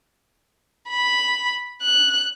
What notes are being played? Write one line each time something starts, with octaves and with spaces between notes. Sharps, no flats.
B5
F#6